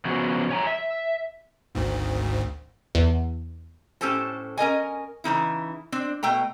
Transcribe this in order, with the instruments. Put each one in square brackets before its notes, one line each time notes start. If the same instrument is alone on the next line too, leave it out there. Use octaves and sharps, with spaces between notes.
[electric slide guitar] C#3 F3 F#3 B3 F#4 G#4
C#5 G#5 A#5
E5
[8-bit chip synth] G#1 D2 G#2
[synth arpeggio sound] E2
[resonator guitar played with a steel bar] A2 C#4 G4 A4 C5 A5
C#4 A#4 D#5 G#5
C#3 E3 D#4 E4
C4 D4
B2 A3 G5 A#5